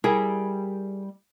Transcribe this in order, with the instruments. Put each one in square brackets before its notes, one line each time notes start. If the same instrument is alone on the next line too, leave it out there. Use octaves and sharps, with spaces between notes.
[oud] G3 E4 A#4 [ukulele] G#4